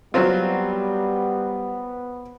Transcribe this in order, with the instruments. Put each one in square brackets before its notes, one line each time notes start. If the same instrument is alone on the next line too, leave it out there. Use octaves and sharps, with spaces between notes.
[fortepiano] F#3 C4 F4 [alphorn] G3 [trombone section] B3